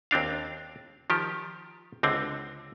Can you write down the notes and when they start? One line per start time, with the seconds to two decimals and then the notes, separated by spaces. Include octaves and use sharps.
0.11 D#2 C4 D4 F5
1.10 D#3 F3 G4
2.03 C#2 D3 C4